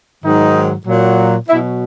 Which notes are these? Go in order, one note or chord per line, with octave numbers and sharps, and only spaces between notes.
G#2 D#3 F#3 D#4
A#2 F#3
B2 F#3 E4